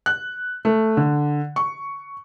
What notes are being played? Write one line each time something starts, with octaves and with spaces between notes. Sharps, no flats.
F#6
A3
D3
C#6